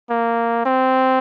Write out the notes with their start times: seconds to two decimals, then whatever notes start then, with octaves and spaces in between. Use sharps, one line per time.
0.10 A#3
0.66 C4